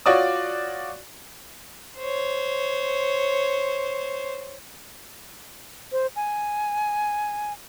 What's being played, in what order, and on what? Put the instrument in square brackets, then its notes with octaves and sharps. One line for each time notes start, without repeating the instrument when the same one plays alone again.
[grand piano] F4 F#4 C#5 D5 D6 D#6
[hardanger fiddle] C5 C#5
[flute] C5
G#5